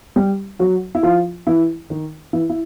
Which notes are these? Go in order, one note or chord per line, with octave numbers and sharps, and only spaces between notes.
G3 G4
F#3 F#4
E4
F3 F4
E3 E4
D#3 D#4
E3 E4
E4